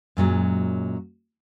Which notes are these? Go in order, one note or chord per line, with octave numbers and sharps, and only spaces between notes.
F#2 A#2 F#3 G#3